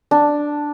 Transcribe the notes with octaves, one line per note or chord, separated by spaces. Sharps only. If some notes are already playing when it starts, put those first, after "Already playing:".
D4